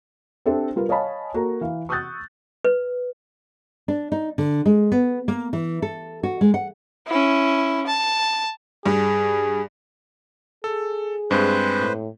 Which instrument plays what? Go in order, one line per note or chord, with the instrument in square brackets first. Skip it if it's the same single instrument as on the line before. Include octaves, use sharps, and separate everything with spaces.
[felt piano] C4 D4 G4 A4 C5 E5
G3 F4 A#4 B4
C#5 D#5 F5 G#5 A5 B5
A#3 F#4 A4 A#5
E3 F5
C#6 D#6 E6 F#6 G6 A6
[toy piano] B4
[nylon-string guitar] D4
D#4
D3
G#3
B3
A#3
E3
A4
F#4
G#3
F#5
[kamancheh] C#4 E4
A5
[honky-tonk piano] G2 [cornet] G#4
[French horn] G#4 [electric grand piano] A4
[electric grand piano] G2 G#3 C4 [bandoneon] B4 C5
[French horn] A2